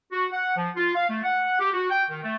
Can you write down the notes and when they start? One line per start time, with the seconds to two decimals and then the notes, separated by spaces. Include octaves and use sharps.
0.12 F#4
0.31 F#5
0.56 F3
0.76 F4
0.94 F5
1.09 A3
1.23 F#5
1.60 G4
1.73 F#4
1.90 G5
2.10 D#3
2.22 A3